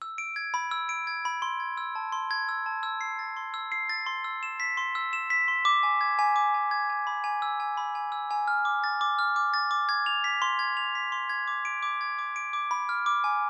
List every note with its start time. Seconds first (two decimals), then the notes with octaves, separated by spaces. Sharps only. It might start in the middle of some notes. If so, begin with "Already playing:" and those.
0.02 E6
0.18 D7
0.36 G#6
0.54 B5
0.71 E6
0.89 D7
1.07 G#6
1.25 B5
1.42 C6
1.60 G#6
1.78 E6
1.95 A5
2.12 C6
2.31 G#6
2.49 E6
2.66 A5
2.83 E6
3.01 C7
3.19 A6
3.37 C6
3.54 E6
3.72 C7
3.89 A6
4.06 C6
4.24 E6
4.43 E7
4.60 B6
4.77 C6
4.95 E6
5.13 E7
5.30 B6
5.48 C6
5.65 D6
5.83 G#5
6.01 G#6
6.19 G#5
6.36 D6
6.54 G#5
6.71 G#6
6.90 G#5
7.07 B5
7.24 G#5
7.42 E6
7.60 G#5
7.77 B5
7.95 G#5
8.12 E6
8.31 G#5
8.48 F6
8.65 D6
8.84 A6
9.01 D6
9.19 F6
9.36 D6
9.54 A6
9.71 D6
9.89 G#6
10.06 F7
10.24 B6
10.42 C6
10.59 G#6
10.77 F7
10.95 B6
11.12 C6
11.29 G#6
11.47 D6
11.65 D7
11.83 D6
12.01 G#6
12.19 D6
12.36 D7
12.53 D6
12.71 B5
12.89 F6
13.06 D6
13.24 G#5